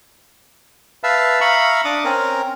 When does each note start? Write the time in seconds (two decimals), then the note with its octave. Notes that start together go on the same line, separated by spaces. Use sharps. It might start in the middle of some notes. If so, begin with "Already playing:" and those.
1.04 B4 E5 F5 A5
1.41 E5 F5 A#5 B5 C#6
1.85 D4 D6 D#6
2.05 C4 C#4 A#4